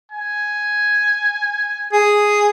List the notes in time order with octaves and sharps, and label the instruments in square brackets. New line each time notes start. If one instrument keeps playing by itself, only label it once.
[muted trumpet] G#5
[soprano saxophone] G#4